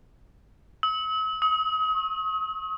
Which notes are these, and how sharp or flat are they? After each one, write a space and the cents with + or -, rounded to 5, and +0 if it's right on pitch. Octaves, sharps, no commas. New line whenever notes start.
E6 -45
D#6 +35
C#6 -30